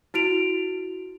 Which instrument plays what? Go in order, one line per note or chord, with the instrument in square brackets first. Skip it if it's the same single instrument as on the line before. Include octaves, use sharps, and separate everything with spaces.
[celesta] E4 F#4 D7 F7